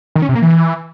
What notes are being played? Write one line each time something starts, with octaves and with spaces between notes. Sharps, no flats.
D#3
C#4
C3
A#3
E3